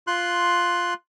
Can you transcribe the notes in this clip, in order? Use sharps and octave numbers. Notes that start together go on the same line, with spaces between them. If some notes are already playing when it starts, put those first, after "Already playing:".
F4 C6 F#6